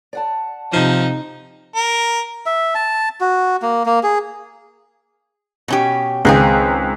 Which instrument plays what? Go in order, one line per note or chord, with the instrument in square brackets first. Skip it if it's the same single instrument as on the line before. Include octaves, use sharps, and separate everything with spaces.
[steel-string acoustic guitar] D5 F#5 A5
[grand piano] C3 D#7 [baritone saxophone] F3 [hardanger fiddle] D#4
[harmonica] A#4
[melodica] E5
A5
F#4
A#3
A#3
G#4
[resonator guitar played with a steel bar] B2 C#4 G4
[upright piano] C#2 [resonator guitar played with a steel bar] D#3 C4 G#4